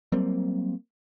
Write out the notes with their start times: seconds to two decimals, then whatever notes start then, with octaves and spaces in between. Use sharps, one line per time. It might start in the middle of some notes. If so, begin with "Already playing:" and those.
0.12 F#3 G3 A#3 C4